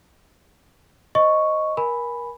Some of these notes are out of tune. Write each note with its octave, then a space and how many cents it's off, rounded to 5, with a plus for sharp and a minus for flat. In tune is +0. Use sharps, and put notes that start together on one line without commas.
C5 +20 D#5 +0 C#6 +0
A#4 +30 G#5 +0 B5 +0